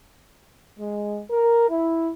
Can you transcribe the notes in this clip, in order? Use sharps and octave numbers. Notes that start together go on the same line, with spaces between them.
G#3
A#4
E4